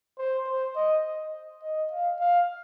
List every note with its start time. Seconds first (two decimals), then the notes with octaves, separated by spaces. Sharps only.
0.18 C5
0.47 C5
0.76 D#5
1.63 D#5
1.91 F5
2.19 F5